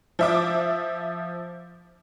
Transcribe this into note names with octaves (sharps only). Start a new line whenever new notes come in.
F3 E5 D6